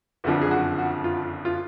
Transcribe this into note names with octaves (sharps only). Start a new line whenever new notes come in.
F#1 F2 D3 F3 F#4
G#4
F#4
F#4
F4
F4